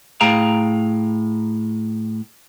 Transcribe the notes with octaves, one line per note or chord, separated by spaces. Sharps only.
A2 G#4 F5 G5 A#5